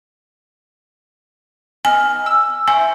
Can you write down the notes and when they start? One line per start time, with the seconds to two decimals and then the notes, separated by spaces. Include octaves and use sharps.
1.85 B3 D#4 G#5 F6
2.26 E6
2.68 E4 C5 G#5 C#6